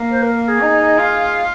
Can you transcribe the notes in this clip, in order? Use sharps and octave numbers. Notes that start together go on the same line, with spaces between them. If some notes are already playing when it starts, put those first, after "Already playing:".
Already playing: A#3
C5
A#4
A#4
G#4
D#4
F4